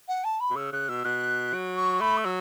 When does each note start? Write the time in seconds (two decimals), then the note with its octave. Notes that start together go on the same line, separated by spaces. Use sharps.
0.08 F#5
0.24 A5
0.40 B5
0.50 B2
0.56 C#3 E6
0.72 C#3 F#6
0.89 B2 E6
1.05 B2 F#6
1.53 F#3
1.77 C#6
2.01 A3 B5
2.17 E6
2.25 F#3